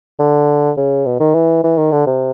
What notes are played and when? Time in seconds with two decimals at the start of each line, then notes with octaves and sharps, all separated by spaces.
0.19 D3
0.77 C#3
1.05 B2
1.20 D#3
1.34 E3
1.63 E3
1.77 D#3
1.91 D3
2.06 C3